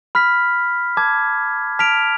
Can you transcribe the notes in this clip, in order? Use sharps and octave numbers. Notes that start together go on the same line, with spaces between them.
B5 F6 B6
A5 D6 G#6
A5 F6 B6 D7 F7